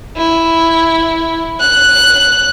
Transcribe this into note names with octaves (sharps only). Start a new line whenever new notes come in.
E4
F#6